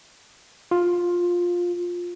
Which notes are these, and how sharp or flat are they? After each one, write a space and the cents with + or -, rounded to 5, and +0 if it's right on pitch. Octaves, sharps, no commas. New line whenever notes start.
F4 +10